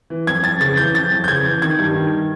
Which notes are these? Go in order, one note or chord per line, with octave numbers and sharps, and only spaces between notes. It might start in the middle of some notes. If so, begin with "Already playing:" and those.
E3
F2 G#6
F2 A6
C#3 A6
E3 G6
F2 A6
F2
G6
C#3 G#6
E3
D#3 G#6
G2
D#3